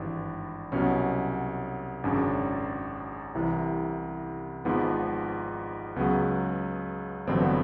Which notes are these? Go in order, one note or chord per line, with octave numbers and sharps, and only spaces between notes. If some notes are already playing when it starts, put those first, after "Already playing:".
Already playing: G#1 G2 E3 D4
C2 B2 F#3 C#4
G#1 F#2 C#3 D4
C2 C3 E3
G#1 G#2 F3 B3
C#2 C#3 F#3 B3
A1 G2 D3 F#3 C4
B3